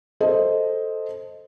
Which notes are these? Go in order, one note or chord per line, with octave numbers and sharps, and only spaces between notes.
A4 C5 D#5